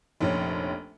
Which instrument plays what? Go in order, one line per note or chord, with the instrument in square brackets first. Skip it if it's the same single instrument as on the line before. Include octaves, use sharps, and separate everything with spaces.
[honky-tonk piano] F1 A#1 C#4